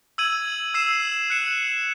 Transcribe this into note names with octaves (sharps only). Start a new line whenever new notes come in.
E6 G#6 D#7 F#7
E6 C7 E7
F#6 C#7 E7